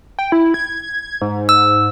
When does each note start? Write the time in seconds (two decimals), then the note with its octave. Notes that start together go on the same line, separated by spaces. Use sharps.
0.19 G5
0.32 E4
0.54 G#6
1.21 G#2
1.49 E6